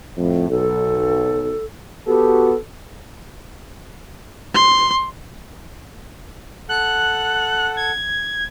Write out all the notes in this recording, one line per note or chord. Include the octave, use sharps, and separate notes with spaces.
F2 A2
B1 A4
B3 F#4 G4 A4
C6
A4 F#5 F#6
G#6